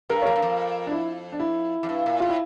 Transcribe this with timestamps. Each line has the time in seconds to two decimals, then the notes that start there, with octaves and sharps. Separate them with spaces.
0.09 G2 A#4
0.22 C#5
0.25 F2 A#4
0.36 G2
0.42 F2
0.87 D4
0.91 E4
1.32 D4
1.40 E4
1.83 F2
1.89 G2
2.06 A#2
2.20 A2 F4
2.29 E4